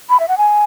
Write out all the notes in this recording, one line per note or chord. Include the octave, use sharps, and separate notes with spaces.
B5
E5
F#5
G#5